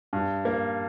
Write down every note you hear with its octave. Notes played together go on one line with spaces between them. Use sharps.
G2
A#3